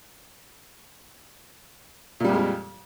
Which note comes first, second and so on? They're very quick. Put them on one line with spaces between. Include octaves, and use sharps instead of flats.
A#2 G3 F2 G#3 F3